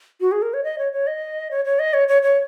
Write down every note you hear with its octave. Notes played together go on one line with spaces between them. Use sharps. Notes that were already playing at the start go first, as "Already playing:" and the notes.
F#4
G#4
A#4
C#5
D#5
C#5
C#5
D#5
C#5
C#5
D#5
C#5
C#5
C#5